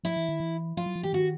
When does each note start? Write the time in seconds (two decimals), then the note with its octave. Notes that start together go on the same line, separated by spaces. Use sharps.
0.04 F3 E4
0.17 E3
0.29 D#3
0.40 E3
0.77 F3 F4
0.86 F#3
0.96 F3
1.03 E3 G4
1.13 D#3 F#4